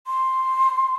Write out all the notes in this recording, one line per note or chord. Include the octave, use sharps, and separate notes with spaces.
C6